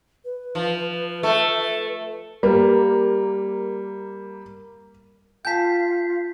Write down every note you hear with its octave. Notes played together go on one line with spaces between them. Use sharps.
B4
F3
A3
G3 A#3
F4 F5 G5 A5 G6 B6